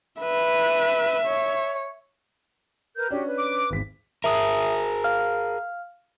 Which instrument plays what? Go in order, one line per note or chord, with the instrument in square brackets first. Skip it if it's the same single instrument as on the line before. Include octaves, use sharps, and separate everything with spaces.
[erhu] B4 [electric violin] E5
[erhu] C#5
[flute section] A#4 B4 G6
[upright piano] C#4 D4 [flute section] F#4 G4
[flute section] B4
[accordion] D6
[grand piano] G#1 E2 B6
[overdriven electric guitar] G#4 A#4 [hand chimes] E5 D#6
[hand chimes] F5 F6